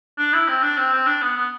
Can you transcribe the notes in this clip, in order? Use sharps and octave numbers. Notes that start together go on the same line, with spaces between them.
D4
E4
C4
D4
C4
C4
D4
B3
B3